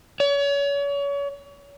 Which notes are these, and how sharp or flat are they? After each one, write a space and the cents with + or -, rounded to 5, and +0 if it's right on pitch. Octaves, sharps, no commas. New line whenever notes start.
C#5 +35